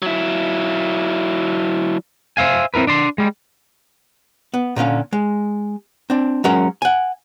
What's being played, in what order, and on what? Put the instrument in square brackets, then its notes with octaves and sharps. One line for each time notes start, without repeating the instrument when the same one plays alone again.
[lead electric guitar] F#3 E4
[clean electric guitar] C5 E5 F5 G#5
C4 E4 A#4 B4
D4 D5 C6
G3 G#3
[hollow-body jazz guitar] B3
A#2 D3 C#4 F5
G#3
C4 D4
F#3 G#3 C#4 A#4 C#5
F#5 G#5